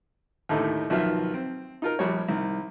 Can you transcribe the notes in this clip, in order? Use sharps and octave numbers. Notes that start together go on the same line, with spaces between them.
D#2 A2 D3 A3 D#4
B1 D#3 F3 F4 E5
C4
D#4 F4 A#4
A#1 G3 C#5
C2 D#3